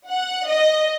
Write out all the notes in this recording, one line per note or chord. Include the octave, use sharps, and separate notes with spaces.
F#5
D#5